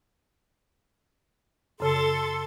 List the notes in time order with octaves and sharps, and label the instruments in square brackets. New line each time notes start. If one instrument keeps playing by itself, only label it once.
[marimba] F#2 C#3 [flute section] A4 C6